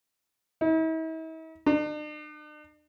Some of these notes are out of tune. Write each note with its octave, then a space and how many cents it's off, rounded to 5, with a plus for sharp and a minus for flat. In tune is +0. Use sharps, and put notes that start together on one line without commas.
E4 -45
D4 +45